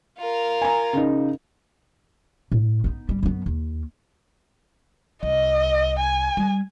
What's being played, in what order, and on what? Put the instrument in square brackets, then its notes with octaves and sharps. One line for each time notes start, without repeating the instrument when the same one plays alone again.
[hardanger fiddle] F4 A#4
[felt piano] G#5 A#5
C#3 D#4
[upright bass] A2
B3 D#4
G#1 G3
F#2 B3
D#2
[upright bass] C2 [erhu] D#5
[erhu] G#5
[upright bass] G3